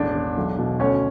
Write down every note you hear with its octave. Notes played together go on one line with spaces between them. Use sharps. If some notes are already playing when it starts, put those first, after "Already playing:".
Already playing: E1 A1 D4 D5
E1
B1
B2
D2 C#4 C#5